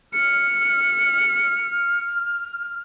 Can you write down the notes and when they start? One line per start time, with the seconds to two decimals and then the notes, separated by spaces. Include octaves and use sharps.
0.14 F6 C#7